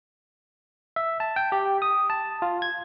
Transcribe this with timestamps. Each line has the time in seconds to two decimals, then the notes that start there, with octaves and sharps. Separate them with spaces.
0.96 E5
1.20 A5
1.36 G5
1.52 G4
1.82 D#6
2.10 A5
2.42 F4
2.62 G#6